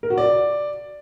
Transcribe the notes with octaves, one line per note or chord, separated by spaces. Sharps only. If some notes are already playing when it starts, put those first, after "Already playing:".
A#4
F#4
D5